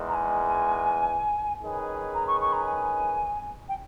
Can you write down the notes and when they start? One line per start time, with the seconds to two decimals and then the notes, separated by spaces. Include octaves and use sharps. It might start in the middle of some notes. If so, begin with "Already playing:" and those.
Already playing: E2 D#3 G#3
0.08 A#5
0.13 G#5
1.63 D#3 G#3 C#4 G#4 B4
2.14 A#5
2.27 C#6
2.40 C#6
2.52 A#5
2.66 G#5
3.68 G5